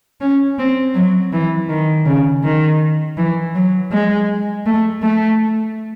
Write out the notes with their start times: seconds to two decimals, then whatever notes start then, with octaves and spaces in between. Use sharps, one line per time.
0.21 C#4
0.59 C4
0.95 F#3
1.33 E3
1.69 D#3
2.06 C#3
2.44 D#3
3.17 E3
3.55 F#3
3.92 G#3
4.66 A3
5.03 A3